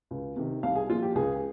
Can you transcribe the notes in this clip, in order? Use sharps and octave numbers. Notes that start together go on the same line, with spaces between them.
C#2
C3 D#3
C2 F5
G#4
A#2 F3 F4
G4
C#2 G#4